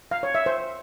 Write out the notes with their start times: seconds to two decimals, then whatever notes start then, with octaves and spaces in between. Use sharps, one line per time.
0.11 F5
0.23 C#5
0.35 E5
0.46 C5